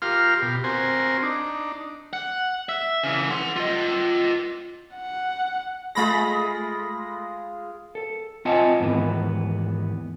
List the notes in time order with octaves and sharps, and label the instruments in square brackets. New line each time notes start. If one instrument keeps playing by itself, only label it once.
[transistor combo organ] F4 G4 A#4 F5 C6 F6
B2 G4
C4 F#4 A#4 C5 G#5
D4 D#4
[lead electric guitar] F#5
E5
C#3 E3
F#5 C6
F4 D#5
[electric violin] F#5
[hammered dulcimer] G#3 F4 G#4 [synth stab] A3 B5 A#6
[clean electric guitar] A4
C4 F4 D#5 F#5 G#5 A5
D#2 G#2 D#3 E3 B3